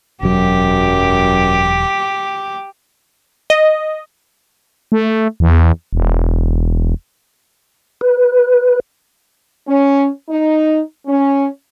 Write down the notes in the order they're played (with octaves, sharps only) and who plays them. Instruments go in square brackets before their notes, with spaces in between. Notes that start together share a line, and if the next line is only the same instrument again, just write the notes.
[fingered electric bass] E1 F#3 [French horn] F#2 [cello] G4
[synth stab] D#5
[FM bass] A3
E2
E1
[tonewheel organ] B4
[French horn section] C#4
D#4
C#4